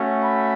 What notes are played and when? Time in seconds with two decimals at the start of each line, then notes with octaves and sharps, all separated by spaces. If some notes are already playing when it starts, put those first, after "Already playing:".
Already playing: A3 C#4 F#4
0.22 B5